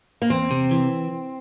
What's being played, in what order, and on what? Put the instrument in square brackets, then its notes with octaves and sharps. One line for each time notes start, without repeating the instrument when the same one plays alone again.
[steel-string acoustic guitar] A#3
[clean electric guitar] E2 [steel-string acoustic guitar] C4
[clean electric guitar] C3
E3